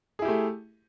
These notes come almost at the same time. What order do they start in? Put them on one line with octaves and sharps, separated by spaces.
G#4 E4 G4 A3